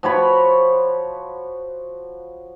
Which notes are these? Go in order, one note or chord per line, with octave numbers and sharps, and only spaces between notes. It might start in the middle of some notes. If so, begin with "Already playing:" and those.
F3 F#4 C#5 B5